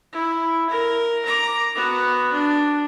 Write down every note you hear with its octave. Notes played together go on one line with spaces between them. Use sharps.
E4
A#4
A#5 D6
B3 F#4
D4